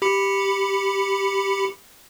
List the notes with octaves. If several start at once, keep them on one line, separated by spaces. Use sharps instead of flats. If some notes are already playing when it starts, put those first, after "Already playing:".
G4 B5 C#7